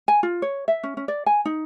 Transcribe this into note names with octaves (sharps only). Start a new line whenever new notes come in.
G#5
F4
C#5
E5
C#4
C#4
D5
G#5
D#4